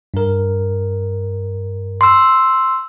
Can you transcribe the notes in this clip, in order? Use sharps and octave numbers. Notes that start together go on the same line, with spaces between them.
G2 A#4
C6 E6